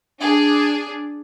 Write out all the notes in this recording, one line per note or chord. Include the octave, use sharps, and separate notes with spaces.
D4 G#4